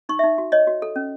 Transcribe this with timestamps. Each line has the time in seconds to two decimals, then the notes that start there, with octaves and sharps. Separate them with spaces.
0.09 D#4 C#6
0.19 E5
0.23 D#4
0.38 F#4
0.52 C#5 D#5
0.67 F#4
0.82 A4
0.96 C#4